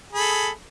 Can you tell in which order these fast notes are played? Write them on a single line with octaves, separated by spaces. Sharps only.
G#4 B5 A4